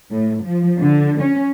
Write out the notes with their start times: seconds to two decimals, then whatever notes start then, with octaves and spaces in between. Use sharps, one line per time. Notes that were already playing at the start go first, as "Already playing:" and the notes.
0.11 A2
0.43 F3
0.79 D3
1.21 C#4